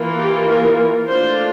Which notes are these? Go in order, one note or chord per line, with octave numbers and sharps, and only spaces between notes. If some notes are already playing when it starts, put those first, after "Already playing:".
Already playing: E3 A#3 F4
G4
A#4
A3 D4 F4 C5